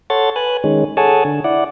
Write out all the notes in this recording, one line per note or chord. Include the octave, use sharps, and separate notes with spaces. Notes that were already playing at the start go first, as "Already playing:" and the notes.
A4 C#5 F#5 C6 A6
B4 G#5 F#6
D#3 G#3 C#4
G#4 A4 C#5 F#5 G#5 A5
D3
E4 D5 F#5